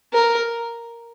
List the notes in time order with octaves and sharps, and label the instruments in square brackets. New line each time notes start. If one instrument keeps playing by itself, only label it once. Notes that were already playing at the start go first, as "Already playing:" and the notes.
[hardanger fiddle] A#4